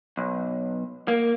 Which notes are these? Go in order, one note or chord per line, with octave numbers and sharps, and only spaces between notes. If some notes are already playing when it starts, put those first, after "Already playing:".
B1
A#3